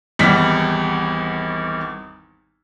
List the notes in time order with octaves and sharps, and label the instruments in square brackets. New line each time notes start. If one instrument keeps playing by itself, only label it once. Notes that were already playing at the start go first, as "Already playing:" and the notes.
[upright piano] G#1 E2 G3 B6